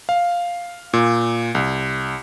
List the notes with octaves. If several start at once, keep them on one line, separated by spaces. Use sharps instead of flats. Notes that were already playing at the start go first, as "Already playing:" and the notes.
F5
A#2
C2